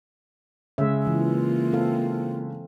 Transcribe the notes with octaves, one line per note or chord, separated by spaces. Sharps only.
C#3 G#3 E5
E3 A#3 F4
C4 A4 F5